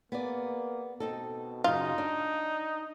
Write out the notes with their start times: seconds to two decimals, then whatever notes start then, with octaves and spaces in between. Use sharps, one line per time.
0.12 A#3 B3 G#4 D5
1.00 B2 C4 D#4 A4
1.64 F#2 C#3 D#4 F4
1.98 D4